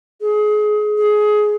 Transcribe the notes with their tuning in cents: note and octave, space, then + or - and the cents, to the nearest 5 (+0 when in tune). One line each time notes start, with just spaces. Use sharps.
G#4 +25
G#4 +15